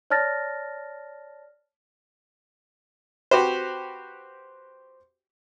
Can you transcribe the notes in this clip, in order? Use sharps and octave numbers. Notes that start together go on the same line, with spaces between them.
C#5 D5 A5 F6 A6 A#6
C4 F#4 G4 B4 C5